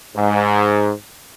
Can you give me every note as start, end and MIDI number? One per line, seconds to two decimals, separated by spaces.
0.16 0.91 44